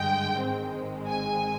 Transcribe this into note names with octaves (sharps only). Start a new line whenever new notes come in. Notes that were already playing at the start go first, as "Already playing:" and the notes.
Already playing: G2 D3 G#3 G5
G#1 G#2 D#3 G#3 C4
G#5